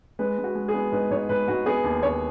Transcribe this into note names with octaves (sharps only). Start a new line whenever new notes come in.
G#3 B4
G#3
F#4
G#3
G#4
B3
G#2 B4
G#2 C#5
G#2 B4
G#2 F#4
B3 G#4
D#2
D#2 C#5